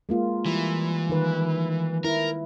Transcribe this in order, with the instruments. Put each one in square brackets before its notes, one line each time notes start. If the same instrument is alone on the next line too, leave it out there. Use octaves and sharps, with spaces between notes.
[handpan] G#3 A#3 F4
[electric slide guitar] E3 [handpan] G3
[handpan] D#3 B4
[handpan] E4 [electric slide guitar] A#4